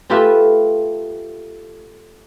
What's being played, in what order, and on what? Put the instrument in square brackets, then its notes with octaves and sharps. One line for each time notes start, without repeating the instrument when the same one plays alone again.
[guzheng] A3 F4 G4 A4 B4 E5